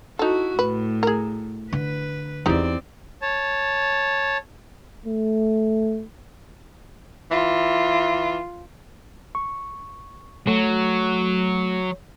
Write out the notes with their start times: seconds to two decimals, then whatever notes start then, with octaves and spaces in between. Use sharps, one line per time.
0.19 D#4 E4 F#4 A4
0.59 A2 B4
1.03 G#4 A#4
1.73 D3 B4
2.46 E2 E3 C4 D#4 G4 D5
3.22 C#5 A5
5.06 A3
7.31 E3 F4
9.35 C#6
10.47 F#3 A3